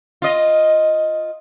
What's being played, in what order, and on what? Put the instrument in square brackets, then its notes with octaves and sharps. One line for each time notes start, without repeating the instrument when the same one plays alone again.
[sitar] F4 D#5